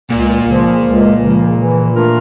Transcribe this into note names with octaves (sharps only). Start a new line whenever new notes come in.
C#2 A#2
C#3 F3
C#2
C#3 F3
E3
A3 D4 F4 A#4